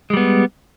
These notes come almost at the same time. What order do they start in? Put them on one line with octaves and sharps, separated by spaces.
G#3 G3 B3